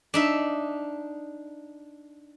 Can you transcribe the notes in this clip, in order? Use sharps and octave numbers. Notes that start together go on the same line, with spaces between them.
D4 D#4 E5